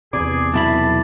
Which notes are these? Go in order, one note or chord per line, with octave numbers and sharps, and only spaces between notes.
E2 C3 G#4 D5
B1 E4 A5 B5